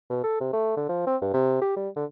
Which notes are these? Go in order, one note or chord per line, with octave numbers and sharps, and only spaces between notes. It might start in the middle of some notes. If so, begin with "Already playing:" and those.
B2
A4
C3
A3
D3
F3
C4
G2
C3
G4
G3
D3